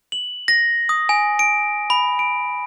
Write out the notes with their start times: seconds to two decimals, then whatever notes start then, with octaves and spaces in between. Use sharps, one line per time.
0.12 F#7
0.48 A#6
0.89 D#6
1.09 G#5
1.39 D7
1.90 B5
2.19 D7